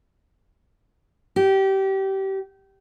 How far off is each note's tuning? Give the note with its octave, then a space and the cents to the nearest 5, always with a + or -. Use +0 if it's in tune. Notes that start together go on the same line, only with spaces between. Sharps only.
G4 -25